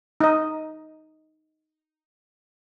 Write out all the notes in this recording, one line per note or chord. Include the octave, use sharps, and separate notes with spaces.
D#4 D#5